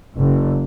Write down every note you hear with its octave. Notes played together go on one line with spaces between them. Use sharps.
F#1